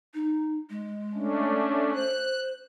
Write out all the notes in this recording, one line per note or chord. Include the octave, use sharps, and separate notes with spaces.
D#4
G#3
A3 C#4 D4
C5 F#6